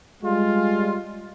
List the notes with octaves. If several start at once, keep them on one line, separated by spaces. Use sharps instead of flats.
G3 G#3 F4